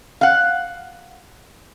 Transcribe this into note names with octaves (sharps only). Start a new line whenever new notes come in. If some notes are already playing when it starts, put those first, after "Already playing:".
F5 F#5